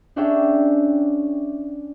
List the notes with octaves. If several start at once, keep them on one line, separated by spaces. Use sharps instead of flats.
C#4 D4 G#4 C#5 E5 G5